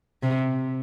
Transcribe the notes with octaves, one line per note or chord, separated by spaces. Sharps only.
C3